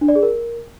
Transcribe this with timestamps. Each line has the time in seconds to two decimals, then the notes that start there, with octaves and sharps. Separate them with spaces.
0.01 D4
0.08 D5
0.15 G#4
0.23 A#4